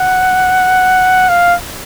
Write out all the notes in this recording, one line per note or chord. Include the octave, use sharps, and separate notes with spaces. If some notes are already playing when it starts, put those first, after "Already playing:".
Already playing: F#5
F5